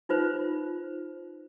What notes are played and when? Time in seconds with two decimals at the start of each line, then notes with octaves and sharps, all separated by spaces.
0.09 D#4 F4 B4 C5